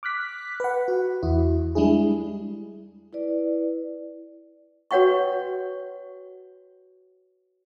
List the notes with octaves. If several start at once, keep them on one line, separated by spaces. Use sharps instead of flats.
D6 F6 F#6 B6
B4 F#5
F#4
E2 E4 F#4
G3 G#3 D4 E4 G#4
E4 B4 D5
F#4 B4 C#5 F#5 G5 C#6